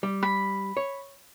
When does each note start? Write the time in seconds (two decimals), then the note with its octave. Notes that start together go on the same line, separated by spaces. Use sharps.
0.03 G3
0.23 B5
0.77 C#5